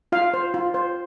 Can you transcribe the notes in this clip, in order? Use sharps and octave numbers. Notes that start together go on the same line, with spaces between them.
F4 F5
C5
F4
C5